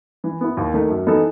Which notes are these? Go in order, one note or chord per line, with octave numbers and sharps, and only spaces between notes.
E3
B3 E4
D#2
D#3 A3
F#2
E3 B3 D#4 A4